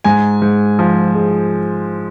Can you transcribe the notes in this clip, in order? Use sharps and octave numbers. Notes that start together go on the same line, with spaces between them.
G#2 G#5
G#2
F3
G#3